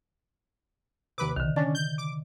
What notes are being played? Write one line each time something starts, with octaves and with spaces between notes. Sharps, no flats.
D#2 C3 B4 D6
B1 D3 D#3
C#4 D4 A6
G6
D6